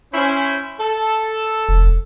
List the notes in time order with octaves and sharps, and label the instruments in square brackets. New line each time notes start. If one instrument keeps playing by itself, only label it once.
[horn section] C#4 E4 C5
A4
[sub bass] F1